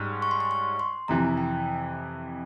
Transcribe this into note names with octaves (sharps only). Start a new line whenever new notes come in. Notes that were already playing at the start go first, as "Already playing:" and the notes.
Already playing: G#2 G3 C#4
C#6
C6
C#6
C#6
C6
F2 C3 E3 A#5
G5